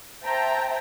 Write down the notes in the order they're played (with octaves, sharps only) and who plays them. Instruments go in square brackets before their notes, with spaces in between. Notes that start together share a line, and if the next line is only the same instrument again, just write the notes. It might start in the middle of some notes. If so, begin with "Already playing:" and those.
[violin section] C5 E5 G5 A5 A#5